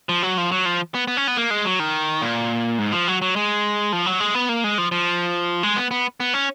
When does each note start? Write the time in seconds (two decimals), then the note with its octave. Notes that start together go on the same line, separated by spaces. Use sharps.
0.09 F3
0.23 F#3
0.38 F3
0.52 F#3
0.65 F3
0.95 B3
1.08 B3
1.17 C#4
1.27 B3
1.37 A#3
1.50 G#3
1.65 F#3
1.80 D#3
2.22 A#2
2.79 G#2
2.92 F3
3.08 F#3
3.22 F#3
3.36 G#3
3.93 F3
4.06 F#3
4.20 G#3
4.35 B3
4.49 A#3
4.64 G#3
4.78 F3
4.92 F3
5.63 G#3
5.76 B3
5.91 B3
6.20 B3
6.34 C#4